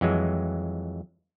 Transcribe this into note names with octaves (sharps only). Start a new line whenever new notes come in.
F2 E3 F#3 G#3